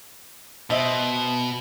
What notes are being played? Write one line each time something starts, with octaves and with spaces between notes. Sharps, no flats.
B2 C5 D#5 E5